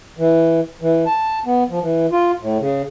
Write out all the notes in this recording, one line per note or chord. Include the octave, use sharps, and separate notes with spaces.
E3
E3
A5
B3
F3
E3
F4
A2
C#3